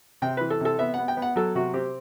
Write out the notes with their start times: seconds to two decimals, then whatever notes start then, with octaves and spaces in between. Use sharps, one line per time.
0.22 C3 G5
0.37 E3 B4
0.50 A4
0.61 C3 A4
0.79 B3 E5
0.94 B3 F#5
1.08 G5
1.17 B3
1.22 F#5
1.36 F#3 A4
1.55 C3 F#4
1.74 C4 G4